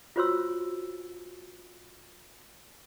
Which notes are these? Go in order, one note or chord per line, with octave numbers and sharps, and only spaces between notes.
F4 F#4 C5 C#5 C6 E6